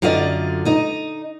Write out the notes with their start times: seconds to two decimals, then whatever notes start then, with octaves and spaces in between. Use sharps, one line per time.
0.02 F#2 D3 F4 D5 D#5
0.65 D#4 D#5